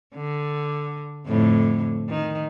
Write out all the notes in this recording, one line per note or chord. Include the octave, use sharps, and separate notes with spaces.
D3
F2 A2 D3
D#3